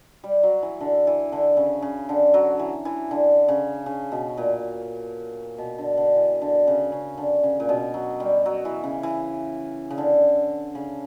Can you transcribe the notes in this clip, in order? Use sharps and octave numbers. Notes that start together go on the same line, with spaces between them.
G3
F#3
E3
D3
E3
D3
C#3
C#3
D3
F#3
E3
E3
D3
C#3
C#3
B2
A#2
B2
D3
D3
E3
D3
C#3
C#3
D3
C#3
A#2
B2
F#3
G3
F#3
E3
C#3
E3
C#3
D3
C#3